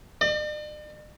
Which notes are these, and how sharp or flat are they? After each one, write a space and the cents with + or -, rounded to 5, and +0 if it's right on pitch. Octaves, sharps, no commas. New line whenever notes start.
D5 +45